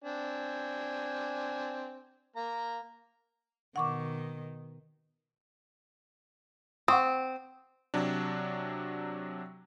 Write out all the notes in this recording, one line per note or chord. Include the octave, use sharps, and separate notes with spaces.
C4 D4 G#5
A#3 A#5
B2 D#3 F#5 C#6 D6
C4 F#5 C#6 D#6
C3 F#3 D4